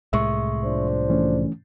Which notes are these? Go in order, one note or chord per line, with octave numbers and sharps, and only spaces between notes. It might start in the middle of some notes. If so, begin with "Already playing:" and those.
C2 A2 G#3 E5 C#6
F3 D4 C5
E3 A3 C#4